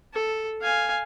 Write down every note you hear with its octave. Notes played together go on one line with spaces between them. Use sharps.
A4
F5 G#5